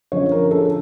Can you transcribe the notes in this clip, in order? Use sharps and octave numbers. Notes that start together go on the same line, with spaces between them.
D3 F3 C#4 C#5
A#4
A4